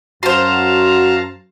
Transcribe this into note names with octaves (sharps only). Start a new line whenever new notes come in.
F#2 F#4 C5 F5 A5 A#5 C6